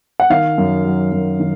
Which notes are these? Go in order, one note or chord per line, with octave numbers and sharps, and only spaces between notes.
F#5
D#3 F5
F#2
F#3
F#2
D#3